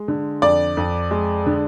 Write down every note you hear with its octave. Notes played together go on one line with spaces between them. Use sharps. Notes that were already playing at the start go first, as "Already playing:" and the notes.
Already playing: G#3
D3
F2 D5
F2
G#3
D3